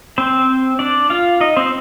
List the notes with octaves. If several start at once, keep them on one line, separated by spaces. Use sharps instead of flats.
C4 C5
D4 D5
F4 F5
D#4 D#5
C4 C5